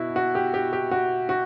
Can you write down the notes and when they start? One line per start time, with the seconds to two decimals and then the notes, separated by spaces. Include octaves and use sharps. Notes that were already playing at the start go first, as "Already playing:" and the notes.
Already playing: B2 E4 F#4
0.16 F#4
0.35 G4
0.54 G4
0.73 G4
0.91 F#4
1.29 F#4